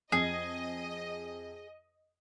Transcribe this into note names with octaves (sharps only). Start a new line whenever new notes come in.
F2 G#4 D#5